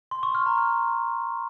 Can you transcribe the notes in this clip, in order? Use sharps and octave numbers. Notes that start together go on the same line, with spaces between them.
C6
C#6
F6
A#5
F6